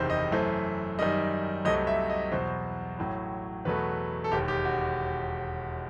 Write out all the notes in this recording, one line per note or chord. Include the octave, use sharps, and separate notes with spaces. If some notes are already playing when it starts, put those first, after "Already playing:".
Already playing: F#1 E2 C3 D#3 C5
D#5
F#2 E3 A3 C5
F#2 D#3 G3 D#5
C2 C3 F#3 A3 D#5
E5
D#5
E2 B2 F#3 C5
A1 A2 F#3
E2 B2 F#3 A3 B4
A4
E1 D#2 D#3 G4
G4
F#4